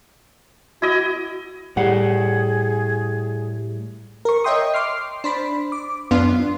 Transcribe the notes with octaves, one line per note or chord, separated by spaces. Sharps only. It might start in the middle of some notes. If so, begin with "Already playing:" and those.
E4 F#4 D#5
A2 G3 G#4 F#5
A#4 C#6
C#5 D#5 E5 G5 C6 D#6
C6 D6 F6 C7
D4 C5 B5
D6
F#2 B3 D4 F4 F5 C6